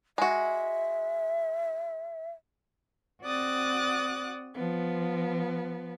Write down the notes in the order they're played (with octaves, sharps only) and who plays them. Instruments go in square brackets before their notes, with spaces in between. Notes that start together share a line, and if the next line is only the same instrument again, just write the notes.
[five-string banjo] G#3 F#4 [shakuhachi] E5
[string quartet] C4 F#4 D5 D#6 F#6 A6
F3 B3